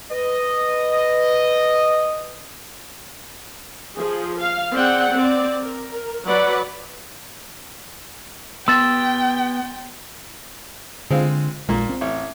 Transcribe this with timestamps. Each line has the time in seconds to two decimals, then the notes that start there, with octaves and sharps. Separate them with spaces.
0.11 B4 D#5
3.96 F3 G#4
4.39 F5
4.75 C4 G#4 D5 F#5 G5
5.14 C4 D5
5.62 A#4
6.25 F#3 B4 D5 F#5 B5
8.68 B3 G4 G5 C6 E6 A6
11.10 D3 G#3 C4 F4
11.69 A#1 A#2 G#3 A#3
11.89 C4
12.01 A1